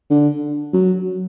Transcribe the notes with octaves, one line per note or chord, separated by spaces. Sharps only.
D3
F#3